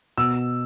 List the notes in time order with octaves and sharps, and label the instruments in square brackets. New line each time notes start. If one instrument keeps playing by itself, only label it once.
[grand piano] B2 E6